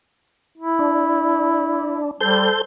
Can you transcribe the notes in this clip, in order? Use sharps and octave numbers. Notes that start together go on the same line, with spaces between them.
E4
D4
G3 A4 C5 G6